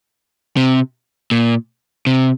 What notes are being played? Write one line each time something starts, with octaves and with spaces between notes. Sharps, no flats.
C3
A#2
C3